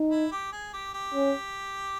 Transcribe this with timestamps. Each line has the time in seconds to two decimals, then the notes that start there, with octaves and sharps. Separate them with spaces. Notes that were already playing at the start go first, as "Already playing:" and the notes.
Already playing: D#4
0.11 E4
0.32 G4
0.53 G#4
0.73 G4
0.94 G4
1.14 C#4